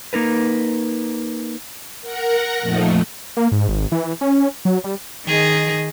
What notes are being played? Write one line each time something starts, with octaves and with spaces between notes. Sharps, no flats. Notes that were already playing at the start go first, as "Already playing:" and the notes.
A#3 D#4 A#4 B4
A#4 F#5 A#5
F2 A#2 F3 A3 D#4
A#3
G#2
G#1
E3
C#4
F#3
G3
D#3 G#4 D#5